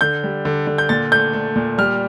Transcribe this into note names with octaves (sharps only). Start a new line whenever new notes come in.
D3 G6
G3
D3
D3
G6
A#2 A6
A3 G6
A3
A#2
G3 F6